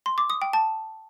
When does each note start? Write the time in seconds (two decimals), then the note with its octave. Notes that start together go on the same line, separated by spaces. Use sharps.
0.06 C6
0.18 D6
0.30 D#6
0.42 G5
0.53 A5